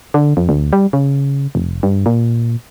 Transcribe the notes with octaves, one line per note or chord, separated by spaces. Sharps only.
D3
F2
D2
G3
C#3
F1
G2
A#2